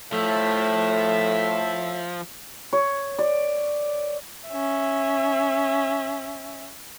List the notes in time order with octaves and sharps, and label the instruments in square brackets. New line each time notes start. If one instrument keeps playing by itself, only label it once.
[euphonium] A2 [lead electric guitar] F3 [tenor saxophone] A3 [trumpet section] E5
[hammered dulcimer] C#5
D5
[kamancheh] C#4 E5